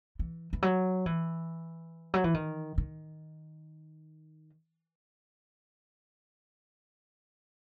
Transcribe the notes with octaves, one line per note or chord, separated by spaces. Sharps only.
E3
E3
F#3
E3
F#3
E3
D#3
D#3